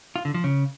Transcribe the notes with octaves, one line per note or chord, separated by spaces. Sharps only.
F4
D3
F3
C#3